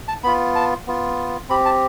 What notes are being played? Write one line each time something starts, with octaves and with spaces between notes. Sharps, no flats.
A5
B3 F4 B5
A5
B3 F4
C4 G4 B5
A5